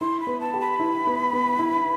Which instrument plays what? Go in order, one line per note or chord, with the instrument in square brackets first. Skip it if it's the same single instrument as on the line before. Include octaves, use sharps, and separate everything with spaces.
[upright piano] E4 [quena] C6
[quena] B5
[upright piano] B3
[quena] A5
[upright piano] G4
[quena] B5
[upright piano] E4
B3
B3
E4